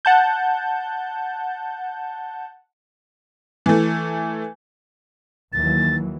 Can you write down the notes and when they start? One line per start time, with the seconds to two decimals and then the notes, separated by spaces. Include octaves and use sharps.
0.05 F#5 A5 G6
3.66 E3 A3
5.53 D#2 E3 F#3 A6